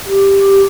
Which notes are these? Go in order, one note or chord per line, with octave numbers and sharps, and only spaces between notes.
G4